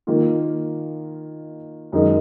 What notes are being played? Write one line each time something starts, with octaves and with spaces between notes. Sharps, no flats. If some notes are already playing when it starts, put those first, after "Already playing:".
D#3 A#3 F4
F#2 D#3 G#3 D#4 A#4